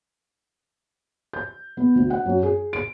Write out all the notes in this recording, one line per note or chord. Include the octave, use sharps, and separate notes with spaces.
G6
B3
D2
F#5
F#2
G#4
D7